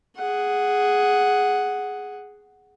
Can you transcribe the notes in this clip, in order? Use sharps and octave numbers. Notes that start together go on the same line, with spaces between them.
G#4 F#5